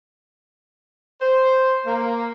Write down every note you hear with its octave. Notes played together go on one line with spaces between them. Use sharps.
C5
A#3